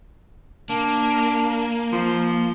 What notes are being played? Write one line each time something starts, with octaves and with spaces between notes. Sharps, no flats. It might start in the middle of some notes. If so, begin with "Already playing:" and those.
A#3 D4
F3